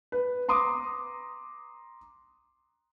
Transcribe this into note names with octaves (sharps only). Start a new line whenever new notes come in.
B4
A#5 C6 D6 D#6